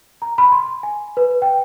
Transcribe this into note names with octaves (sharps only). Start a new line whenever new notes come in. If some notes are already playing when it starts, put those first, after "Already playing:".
A#5
B5
C6
G#5
B4
G5